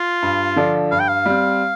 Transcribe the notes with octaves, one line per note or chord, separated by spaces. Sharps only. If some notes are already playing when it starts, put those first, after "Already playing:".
Already playing: F4
G2
D3 F3 D4
G2 F5
G5
F5
G3 C4